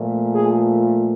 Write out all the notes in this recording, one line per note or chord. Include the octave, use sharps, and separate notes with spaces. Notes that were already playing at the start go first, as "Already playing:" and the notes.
Already playing: A#2 F3 A3
G#4